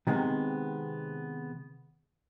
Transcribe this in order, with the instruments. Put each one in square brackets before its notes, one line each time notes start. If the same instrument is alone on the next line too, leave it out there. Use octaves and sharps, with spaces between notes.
[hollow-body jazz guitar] C3 D#3 G3 G#3 B3 C4